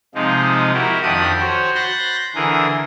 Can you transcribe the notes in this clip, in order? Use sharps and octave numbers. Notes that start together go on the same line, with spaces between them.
C3 F3 G#3 D#4 F4
E4 F#4 G4 A#4
F2 D#3 D4 G4 D#6 F#6
F#4 C5 C#5
B5 C6 F#6 G6 A6 A#6
D3 E3 G#4 A#4